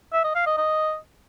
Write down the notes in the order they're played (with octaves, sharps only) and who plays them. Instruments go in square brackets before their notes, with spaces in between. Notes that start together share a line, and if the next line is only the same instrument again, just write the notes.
[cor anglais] E5
D#5
F5
D#5
D#5